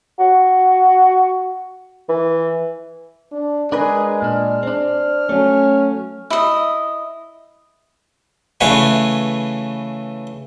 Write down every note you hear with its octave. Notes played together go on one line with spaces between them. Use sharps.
F#4
E3
D4
G#3 D4 G#4 A#4 B4
A#2 D4 F6
C4 D4
F#3 A3 C#4
E4 D#5
C#3 E3 A3 B4 C#5 C#6